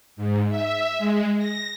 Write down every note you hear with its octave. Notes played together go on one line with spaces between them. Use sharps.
G#2
E5
G#3
A#6